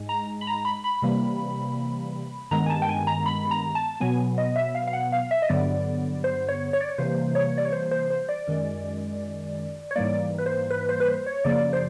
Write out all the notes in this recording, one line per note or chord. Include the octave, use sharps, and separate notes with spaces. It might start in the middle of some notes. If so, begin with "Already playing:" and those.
Already playing: G#2 G#3
A#5
B5
A#5
B5
B5
C3 E3 G3 A#3
G2 D#3 G#3 B3 A#5
G#5
A5
G5
G#5
A#5
B5
A#5
A5
B2 F#3 B3 G#5
D#5
E5
F5
F5
F#5
F5
E5
D#5
G2 D3 F#3 B3 D5
C5
C#5
C#5
D5
C#5
C3 E3 G3 A#3 C5
C#5
D5
C#5
C5
C5
C5
D5
F#2 D#3 G#3
C#5
G#2 E3 G3 A#3 D5
B4
C5
B4
C5
B4
C5
C#5
F#2 C#3 F3 A#3 D5
C5